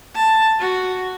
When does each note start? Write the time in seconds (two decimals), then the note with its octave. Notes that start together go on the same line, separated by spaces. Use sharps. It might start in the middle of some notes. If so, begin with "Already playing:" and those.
0.15 A5
0.59 F#4